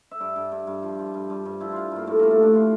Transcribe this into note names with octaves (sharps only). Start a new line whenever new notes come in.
E5
G2 D5
G2
G2
G2
F3
F3
G2
G2
G2
F3 E4
F3 F4
G2 A#3
A2 A3
A2 A#3
A3
A2 D4
F3 F4